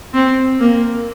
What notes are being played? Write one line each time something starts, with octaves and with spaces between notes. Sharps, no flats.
C4
A#3